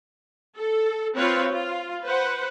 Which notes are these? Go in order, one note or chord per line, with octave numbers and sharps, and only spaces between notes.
A4
C4 F4 B4 C#5
F4
B4 C5 F#5